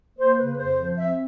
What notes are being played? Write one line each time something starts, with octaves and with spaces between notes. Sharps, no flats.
A#3 C5
C#3 B4
F2 C5
F3
C4 E5